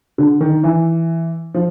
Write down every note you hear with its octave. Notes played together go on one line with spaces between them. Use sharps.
D3
D#3
E3
F3